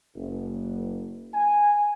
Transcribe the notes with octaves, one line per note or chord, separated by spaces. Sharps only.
F#1
G#5